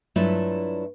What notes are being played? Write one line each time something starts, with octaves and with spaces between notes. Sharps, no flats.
G2 F#3 A3 E4 F4 E5